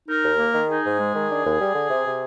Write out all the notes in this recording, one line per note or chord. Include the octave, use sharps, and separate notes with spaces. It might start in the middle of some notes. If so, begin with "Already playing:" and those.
D#4 A#4
D#2
A#3
D#3
D#4 G#4
G#2
G#3
D#3
D4
D#2
G3
D3
C3
C3